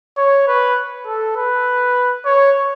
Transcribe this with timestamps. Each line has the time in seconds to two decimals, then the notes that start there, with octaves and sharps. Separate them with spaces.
0.17 C#5
0.48 B4
1.06 A4
1.36 B4
2.25 C#5